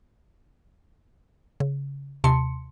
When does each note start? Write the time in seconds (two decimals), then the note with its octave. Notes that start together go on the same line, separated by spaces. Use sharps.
1.60 C#3
2.24 D#2 C3 A5 C6 C#7